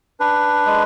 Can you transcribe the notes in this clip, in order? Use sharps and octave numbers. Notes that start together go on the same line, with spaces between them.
D4 B4
G#3